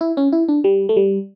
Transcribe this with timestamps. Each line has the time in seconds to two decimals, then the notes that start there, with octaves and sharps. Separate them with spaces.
0.01 E4
0.17 C#4
0.32 E4
0.48 D4
0.64 G3
0.89 A3
0.96 G3